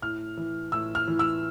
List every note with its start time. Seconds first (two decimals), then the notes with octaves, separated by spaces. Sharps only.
0.02 A2 F6
0.37 E3
0.72 A2 E6
0.95 F6
1.08 E3
1.19 E6